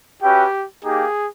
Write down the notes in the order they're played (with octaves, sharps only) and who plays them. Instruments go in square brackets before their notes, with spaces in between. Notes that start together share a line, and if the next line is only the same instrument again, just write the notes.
[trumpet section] C#4 F#4 B4 E5 G5 [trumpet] G4
[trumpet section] A#3 D#4 G4 [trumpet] G#4